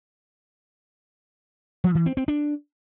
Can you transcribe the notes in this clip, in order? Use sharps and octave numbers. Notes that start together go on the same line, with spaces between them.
F3
E3
C4
C4
D4